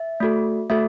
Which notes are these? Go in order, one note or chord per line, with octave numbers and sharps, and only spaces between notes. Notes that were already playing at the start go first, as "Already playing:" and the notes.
Already playing: E5
A3 F#4 A4
A3 F#4 A4 E5